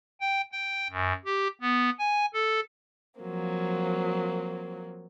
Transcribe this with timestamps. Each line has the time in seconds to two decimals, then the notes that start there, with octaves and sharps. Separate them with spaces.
0.20 G5
0.52 G5
0.90 F#2
1.25 G4
1.61 B3
1.99 G#5
2.34 A4
3.20 F3 F#3 A#3 C4